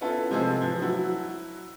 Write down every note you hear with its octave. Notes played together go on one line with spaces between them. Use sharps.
B3 C#4 E4 F4 A4
C3 F3 G#3 G#4 A4
E3 F3
F#3 E4 F#4